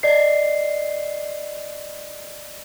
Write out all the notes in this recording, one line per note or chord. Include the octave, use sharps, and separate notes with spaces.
D5 D#5 C7